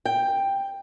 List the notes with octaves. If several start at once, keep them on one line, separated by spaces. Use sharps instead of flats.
G5